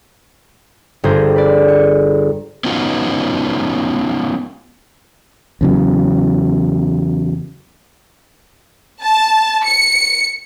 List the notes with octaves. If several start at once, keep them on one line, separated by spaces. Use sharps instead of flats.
G1 G#4 C5 A#6
B4 D5
C#7
B3 C#4 D#4 F4 F#4
E2 C#3 F#3
A5
C#7